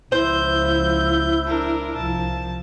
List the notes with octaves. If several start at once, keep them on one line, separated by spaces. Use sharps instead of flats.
C#2 F3 E4 C5 G6
D4 A#4
C2 F3 A5